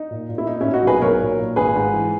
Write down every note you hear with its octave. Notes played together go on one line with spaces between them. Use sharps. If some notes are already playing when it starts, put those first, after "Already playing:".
Already playing: D#4
A#2
A#2
E4
A#2 D#4
A#2 C#4 E4
D#4 F#4
B1 G#4 B4
B1 A#4 C#5
A#2
A#2
G#1 G#4 B4
G#2
E3